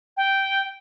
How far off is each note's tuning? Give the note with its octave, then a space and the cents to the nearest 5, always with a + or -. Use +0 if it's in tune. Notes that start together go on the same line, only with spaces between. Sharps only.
G5 -5